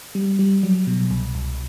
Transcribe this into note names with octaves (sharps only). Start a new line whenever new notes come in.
G3
G3
F#3
B2
C2
C2